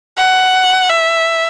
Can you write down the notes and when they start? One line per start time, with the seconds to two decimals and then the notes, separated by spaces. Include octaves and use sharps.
0.17 F#5
0.89 E5